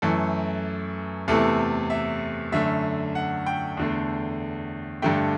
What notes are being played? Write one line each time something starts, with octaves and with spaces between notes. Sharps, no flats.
F#2 E3 A3 A4
E2 C3 E3 A3 A4
E5
F#2 D3 A3 E5
F#5
G5
E2 D3 A3
G2 D3 A3 G5